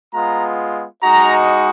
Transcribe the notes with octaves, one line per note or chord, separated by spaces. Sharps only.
G#3 B3 F4 A#5
G#3 D#4 F#4 A#5